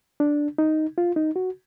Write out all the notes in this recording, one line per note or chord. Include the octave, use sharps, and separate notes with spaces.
D4
D#4
F4
D#4
F#4